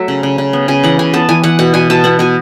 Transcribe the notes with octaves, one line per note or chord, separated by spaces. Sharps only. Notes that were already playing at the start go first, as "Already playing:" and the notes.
Already playing: F#3 A3 E5 F#5
C#3
C#3
C#3
B3
C#3 G#5
E3 F#5
C#3 G#5
B3 A5
E3 G#5
E3 F#5
B2 F#5
B2 G#5
B2 A5
B3 F#5
B2 G#5